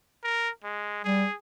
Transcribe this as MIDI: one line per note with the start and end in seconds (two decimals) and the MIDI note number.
0.24 0.50 70
0.64 1.01 56
1.04 1.26 55
1.04 1.35 68